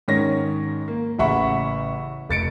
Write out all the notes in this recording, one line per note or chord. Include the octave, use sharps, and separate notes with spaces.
G#2 D#3 C#4 C#5 A#6
A#3
A1 C#3 E5 F#5 B5 C#6
F1 A6 C#7 D7